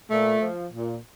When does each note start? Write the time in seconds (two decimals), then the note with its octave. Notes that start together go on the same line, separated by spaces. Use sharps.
0.10 A#2 A3
0.41 F3
0.72 A#2